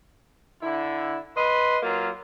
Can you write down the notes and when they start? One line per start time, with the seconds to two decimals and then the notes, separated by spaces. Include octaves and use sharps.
0.62 D3 E4
1.35 B4 D#5 C6
1.83 F#3 A#3 F4